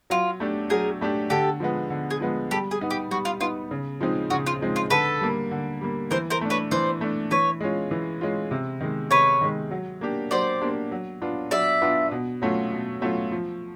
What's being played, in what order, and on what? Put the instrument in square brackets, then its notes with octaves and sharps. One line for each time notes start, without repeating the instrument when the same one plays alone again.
[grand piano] F#3 [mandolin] F4
[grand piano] A3 D4 G4
[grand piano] F#3 [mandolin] G#4 A#4
[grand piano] A3 D4 G4
[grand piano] D3 [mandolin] G4 A4
[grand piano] F3 G#3 B3
D3
[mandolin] G#4
[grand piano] F3 G#3 B3
[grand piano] G3 [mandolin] G4 A4
[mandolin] G#4
[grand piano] B3 D#4
[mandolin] G4
[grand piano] G3 [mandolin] F#4
[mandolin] F4
[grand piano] B3 D#4 [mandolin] F4
[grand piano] C#3
F3 G#3 C4 D#4
[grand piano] C#3 [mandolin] F#4
[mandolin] F4
[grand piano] F3 G#3 C4 D#4
[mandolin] F4
[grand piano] D3 [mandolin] A4 B4
[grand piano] G3 A#3
D3
G3 A#3
[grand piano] E3 [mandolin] A#4 C5
[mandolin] A#4 C5
[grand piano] A3 D4
[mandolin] B4 C#5
[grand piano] E3 [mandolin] C5 D5
[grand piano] A3 D4
[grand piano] E3 [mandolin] B4 C#5
[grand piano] G#3 C#4 F4
E3
G#3 C#4 F4
C3
D#3 G#3
[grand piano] C3 [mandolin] B4 C#5
[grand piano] D#3 G#3
F#3
A#3 D4 G4
[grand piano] F#3 [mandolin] C5 D5
[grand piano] A#3 D4 G4
F#3
B3 D4 F4
[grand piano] F#3 [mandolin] D5 E5
[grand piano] B3 D4 F4
B2
F#3 A3 C#4 F4
B2
F#3 A3 C#4 F4
F3